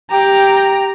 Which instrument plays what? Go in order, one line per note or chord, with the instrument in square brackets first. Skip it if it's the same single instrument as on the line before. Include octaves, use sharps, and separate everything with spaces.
[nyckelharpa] G4 [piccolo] G5 [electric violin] A#5